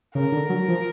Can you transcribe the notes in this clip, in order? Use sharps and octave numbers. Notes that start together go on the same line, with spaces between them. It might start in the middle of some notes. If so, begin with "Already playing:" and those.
C#3 A#4
D3
F#3
F3